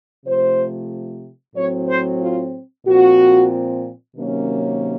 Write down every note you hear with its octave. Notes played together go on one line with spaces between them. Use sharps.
C3 F3 A3 C5
A2 F#3 C4 C#5
C5
F4
A#2 F3 C4 F#4
C3 D#3 F#3 A#3 C#4